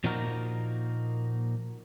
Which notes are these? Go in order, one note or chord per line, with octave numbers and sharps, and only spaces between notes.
A#2 F3 A#3 D#4 F#4 A#4